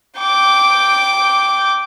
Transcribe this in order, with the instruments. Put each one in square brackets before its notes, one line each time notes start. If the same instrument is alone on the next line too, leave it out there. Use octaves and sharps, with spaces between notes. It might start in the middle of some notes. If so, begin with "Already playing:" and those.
[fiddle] G5 D6